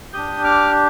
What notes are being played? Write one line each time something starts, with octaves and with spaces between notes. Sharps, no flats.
D4 G4 D#6 G6
D6 F6